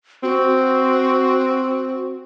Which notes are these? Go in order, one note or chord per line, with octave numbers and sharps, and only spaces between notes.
C4 F#4